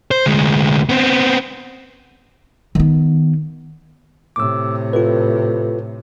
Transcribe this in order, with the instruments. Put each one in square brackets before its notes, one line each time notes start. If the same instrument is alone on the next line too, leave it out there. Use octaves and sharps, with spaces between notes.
[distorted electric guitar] C5
D2 G#3
B3 C4
[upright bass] D#3 B3
[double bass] A2 C3 [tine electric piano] D6 E6
[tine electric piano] F4 A4 B4